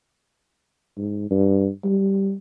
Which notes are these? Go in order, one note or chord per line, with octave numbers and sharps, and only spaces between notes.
G#2
G2
G3